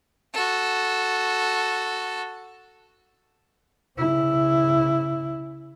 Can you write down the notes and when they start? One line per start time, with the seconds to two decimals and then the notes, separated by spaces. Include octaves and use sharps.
0.33 F#4 A4
3.97 C#3 E4